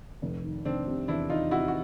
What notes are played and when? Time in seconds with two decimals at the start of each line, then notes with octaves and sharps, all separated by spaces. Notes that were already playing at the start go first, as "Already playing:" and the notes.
0.22 F1
0.43 D#3
0.65 F1 C4 D4
0.87 C3
1.08 E2 D4 E4
1.30 D#3 D#4 F4
1.51 C3 E4 F#4
1.68 F#4